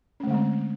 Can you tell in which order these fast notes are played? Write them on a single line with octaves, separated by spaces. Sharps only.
C#4 A3 D3 G#3 C4